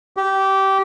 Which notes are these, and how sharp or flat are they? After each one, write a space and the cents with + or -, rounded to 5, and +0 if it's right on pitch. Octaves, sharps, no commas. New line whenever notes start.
G4 -20